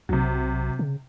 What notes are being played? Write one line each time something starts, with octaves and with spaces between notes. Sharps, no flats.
B1 C3 F#3
C#3